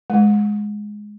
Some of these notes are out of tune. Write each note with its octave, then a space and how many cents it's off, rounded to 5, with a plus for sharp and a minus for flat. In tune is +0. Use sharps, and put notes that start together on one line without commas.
G#3 +5